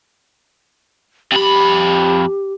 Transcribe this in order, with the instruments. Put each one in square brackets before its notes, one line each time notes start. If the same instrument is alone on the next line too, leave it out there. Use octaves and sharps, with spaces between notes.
[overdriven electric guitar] F2 B5 [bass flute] G4